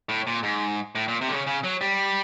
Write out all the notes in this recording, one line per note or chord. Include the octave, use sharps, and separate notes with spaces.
A2
A#2
G#2
A2
A#2
C3
D3
C#3
C#3
F#3
G3